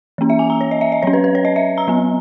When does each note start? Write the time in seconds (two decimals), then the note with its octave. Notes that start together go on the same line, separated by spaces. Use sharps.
0.18 E3 A#3 C#4
0.30 E5
0.39 G#5
0.50 A#5
0.61 C#5
0.71 D#5
0.81 E5
0.92 D#5
1.02 F#3 C#4 C#5
1.13 B4
1.24 B4
1.35 C#5
1.45 D#5
1.56 E5
1.78 A#5
1.88 F#3 B3